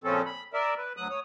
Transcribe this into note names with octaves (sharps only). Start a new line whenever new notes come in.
A#2 C#3 F3 C4 C#4 A4
B5
A#4 D5 E5
B4
D2 F#3 D#6 F#6
C#5 D#6